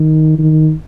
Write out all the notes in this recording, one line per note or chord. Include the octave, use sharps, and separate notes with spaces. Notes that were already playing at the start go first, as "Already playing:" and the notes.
Already playing: D#3
D#3